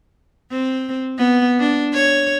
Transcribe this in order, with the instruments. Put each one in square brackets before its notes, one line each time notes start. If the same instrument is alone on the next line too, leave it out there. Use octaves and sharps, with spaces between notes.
[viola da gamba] C4
B3
D4
C#5